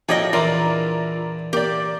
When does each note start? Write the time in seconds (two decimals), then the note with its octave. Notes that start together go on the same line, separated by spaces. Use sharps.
0.09 A2 F3 F#3 A#3 G4 D5 D#5 G#5
0.33 E2 A#2 D4 E4 F4 A#4 D5
1.53 A#3 G4 D5